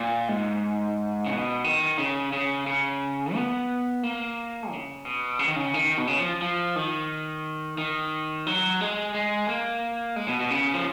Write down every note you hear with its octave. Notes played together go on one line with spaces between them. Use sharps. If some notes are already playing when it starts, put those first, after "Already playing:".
Already playing: A#2
G#2
C#3
B2
D#3
C#3
C#3
C#3
B3
A#3
C#3
B2
C#3
D#3
C#3
D#3
B2
C#3
F3
F3
D#3
D#3
F#3
G#3
G#3
A#3
G#3
B2
B2
C#3
F3